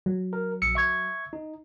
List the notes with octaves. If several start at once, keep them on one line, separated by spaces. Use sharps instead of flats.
F#3
A#4
A#1 E6 C#7
E5 C#6 G#6
D#4